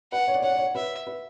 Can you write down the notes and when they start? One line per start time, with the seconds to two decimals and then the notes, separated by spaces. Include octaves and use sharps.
0.12 B4 F#5
0.28 C#5
0.35 D5
0.42 C#5 F#5
0.50 D5
0.58 C#5
0.75 B4 E5
1.07 B4